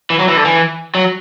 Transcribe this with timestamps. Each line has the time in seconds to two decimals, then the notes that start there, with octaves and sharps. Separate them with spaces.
0.10 E3
0.20 F#3
0.29 E3
0.37 D3
0.45 E3
0.95 F#3